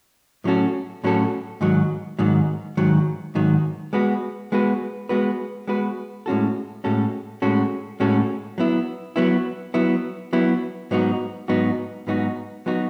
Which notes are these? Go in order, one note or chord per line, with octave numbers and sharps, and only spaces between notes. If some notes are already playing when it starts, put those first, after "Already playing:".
A2 F#3 C#4 F#4 A4
A2 F#3 C#4 F#4 A4
G#2 D#3 F#3
G#2 D#3 F#3
G#2 D#3 F#3
G#2 D#3 F#3
G#3 B3 F#4 B4
G#3 B3 F#4 B4
G#3 B3 F#4 B4
G#3 B3 F#4 B4
A2 G#3 C#4 F#4 A4
A2 G#3 C#4 F#4 A4
A2 G#3 C#4 F#4 A4
A2 G#3 C#4 F#4 A4
F#3 B3 E4
F#3 B3 E4
F#3 B3 E4
F#3 B3 E4
G#2 F#3 B3 D#4 F#4
G#2 F#3 B3 D#4 F#4
G#2 F#3 B3 D#4 F#4
F#3 B3 D#4 F#4